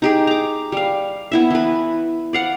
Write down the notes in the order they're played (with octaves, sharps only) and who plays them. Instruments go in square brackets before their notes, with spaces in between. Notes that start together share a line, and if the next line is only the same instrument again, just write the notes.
[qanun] D#4 G4 G#4
A#5 D6
G3 F5
B3 E4 E5
E3 B4
D5 F5 F#5